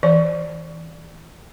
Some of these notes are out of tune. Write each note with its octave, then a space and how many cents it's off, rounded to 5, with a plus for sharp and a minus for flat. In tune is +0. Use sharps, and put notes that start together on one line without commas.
E3 -25 D5 +5